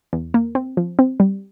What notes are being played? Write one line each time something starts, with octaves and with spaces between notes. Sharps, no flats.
E2
A#3
C4
F3
C4
G3